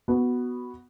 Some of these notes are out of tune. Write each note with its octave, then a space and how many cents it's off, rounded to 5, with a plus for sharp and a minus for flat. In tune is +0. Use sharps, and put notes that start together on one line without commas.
B3 +0 F#4 +0